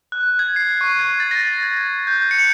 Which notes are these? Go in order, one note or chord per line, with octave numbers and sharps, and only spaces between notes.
F#6
G#6
C7
C#6
G#6
A6
A#6
A6
G#6
G6
C#7